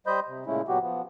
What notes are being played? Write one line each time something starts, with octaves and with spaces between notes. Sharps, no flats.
G3 C5 D#5 B5 G6
C3
A#2 C#3 G#3 A3 C#4 E4
A#2 F#3 B3 F#4 G4
F3 B3